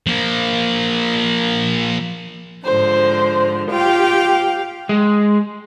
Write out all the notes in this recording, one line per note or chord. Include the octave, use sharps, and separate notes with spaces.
F3 A#3
G#2 D3 F3 C5
F4 G4 F5 G5
G#3